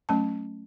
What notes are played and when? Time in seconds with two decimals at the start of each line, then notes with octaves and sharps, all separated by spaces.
0.09 F#3 A3 C#4 A5